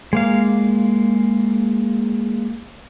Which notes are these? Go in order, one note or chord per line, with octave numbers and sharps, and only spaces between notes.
G#3 A#3 F5